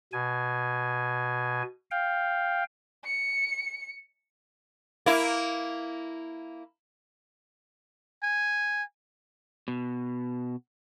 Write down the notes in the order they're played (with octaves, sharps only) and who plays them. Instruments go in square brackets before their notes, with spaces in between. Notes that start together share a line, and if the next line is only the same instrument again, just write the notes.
[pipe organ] B2 G#5
F5 G5
[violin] C#7
[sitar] A#3 E4
[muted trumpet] G#5
[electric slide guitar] B2